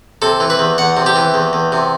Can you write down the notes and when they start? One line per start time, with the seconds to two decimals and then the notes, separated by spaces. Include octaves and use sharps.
0.22 C3 A4
0.40 E3
0.50 B4
0.59 E2
0.78 E2 F#5
0.97 C3
1.06 G4
1.16 E3
1.34 E2
1.53 E2
1.72 C3